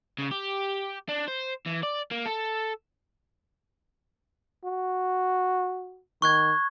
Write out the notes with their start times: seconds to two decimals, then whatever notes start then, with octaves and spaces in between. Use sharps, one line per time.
0.18 C#3
0.31 G4
1.09 D4
1.28 C5
1.66 E3
1.83 D5
2.11 A#3
2.26 A4
4.64 F#4
6.22 D#3 C#6 F#6 G#6